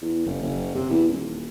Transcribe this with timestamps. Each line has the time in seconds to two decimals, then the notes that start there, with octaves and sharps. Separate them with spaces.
0.02 E2
0.26 F#1
0.42 F#1
0.75 C3
0.90 E2
1.09 D#1